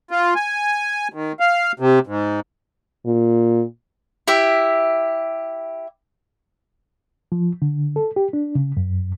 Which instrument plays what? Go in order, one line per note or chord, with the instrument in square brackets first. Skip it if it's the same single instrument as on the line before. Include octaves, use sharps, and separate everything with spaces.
[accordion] F4
G#5
D#3
F5
C3
G#2
[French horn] A#2
[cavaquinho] E4 G4 E5
[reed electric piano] F3
D3
A4
G4
D4
C#3
F#2